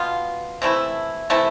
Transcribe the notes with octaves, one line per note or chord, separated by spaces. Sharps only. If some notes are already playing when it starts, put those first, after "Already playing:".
Already playing: B2 B3 F4
C3 E3 A3 E4
C3 E3 A3 E4